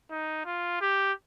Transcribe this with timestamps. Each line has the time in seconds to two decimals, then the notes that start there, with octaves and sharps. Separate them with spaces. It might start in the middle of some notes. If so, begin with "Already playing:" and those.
0.11 D#4
0.46 F4
0.81 G4